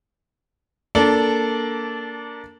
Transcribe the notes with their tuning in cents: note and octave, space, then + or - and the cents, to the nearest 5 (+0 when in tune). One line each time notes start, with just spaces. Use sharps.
A#3 +0 D4 -20 A4 +0